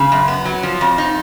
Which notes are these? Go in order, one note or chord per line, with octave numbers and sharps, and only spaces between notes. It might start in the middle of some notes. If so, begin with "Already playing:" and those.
Already playing: C#3
F#2
B3
F#3
F3
F2
D#4